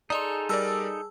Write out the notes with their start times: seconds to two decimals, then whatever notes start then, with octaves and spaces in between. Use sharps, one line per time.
0.10 D#4 G#4 A4 D5 D#5 C6 D#6 F7
0.49 G3 A#4 D5 A5 E6